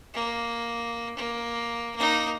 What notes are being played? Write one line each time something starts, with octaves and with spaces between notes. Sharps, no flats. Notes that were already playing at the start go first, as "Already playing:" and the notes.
A#3
A#3
A#3 D#4